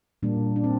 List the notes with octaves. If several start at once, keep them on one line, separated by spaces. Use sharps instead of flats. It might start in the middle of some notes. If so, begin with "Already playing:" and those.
A#2 G3 A#3 D4
D4
C4